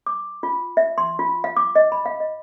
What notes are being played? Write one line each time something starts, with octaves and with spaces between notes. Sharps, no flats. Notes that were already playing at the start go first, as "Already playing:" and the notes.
D6
F4
E5
C6
F4
F5
D6
D#5
B5
F5
D#5